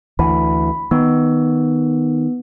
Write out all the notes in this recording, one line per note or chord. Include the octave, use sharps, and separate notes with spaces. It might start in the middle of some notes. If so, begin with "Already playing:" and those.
D2 E3 B5
D#3 B3